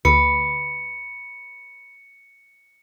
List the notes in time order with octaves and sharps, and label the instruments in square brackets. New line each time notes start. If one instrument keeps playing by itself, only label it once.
[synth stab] D2 [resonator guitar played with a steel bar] B4 [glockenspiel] C#7